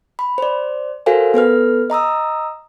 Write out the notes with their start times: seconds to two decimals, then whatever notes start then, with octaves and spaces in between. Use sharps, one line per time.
0.19 B5
0.38 C5 D5
1.06 F#4 A4 A#4 C5 F5 G#5
1.34 B3 A4 B4 F6
1.90 D#5 A#5 D#6 E6